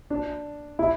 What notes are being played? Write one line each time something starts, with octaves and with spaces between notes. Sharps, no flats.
D4
E4